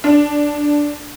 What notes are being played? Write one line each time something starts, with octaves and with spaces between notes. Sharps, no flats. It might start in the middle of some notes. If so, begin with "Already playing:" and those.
D4